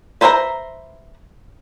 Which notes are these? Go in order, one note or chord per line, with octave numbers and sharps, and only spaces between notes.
B4 C5 E5 G5 A#5